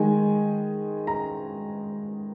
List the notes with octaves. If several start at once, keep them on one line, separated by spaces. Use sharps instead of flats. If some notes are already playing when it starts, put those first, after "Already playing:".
Already playing: D#3 G#3 G#5
A#5